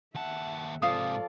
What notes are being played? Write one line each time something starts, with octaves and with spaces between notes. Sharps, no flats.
D#2 E5 F#5 A5
G#2 C3 F3 F4 A4 D5 F5 D#6